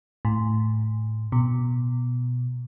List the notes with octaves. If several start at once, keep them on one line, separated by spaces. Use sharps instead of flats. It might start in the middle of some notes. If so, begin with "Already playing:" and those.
A2
B2